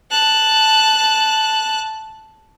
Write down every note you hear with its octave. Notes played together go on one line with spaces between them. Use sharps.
A5 F#6